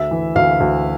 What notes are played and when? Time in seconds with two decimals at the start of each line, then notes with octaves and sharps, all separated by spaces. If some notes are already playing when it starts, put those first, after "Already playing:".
Already playing: D2 E5
0.11 E3
0.35 D2 F5
0.60 D2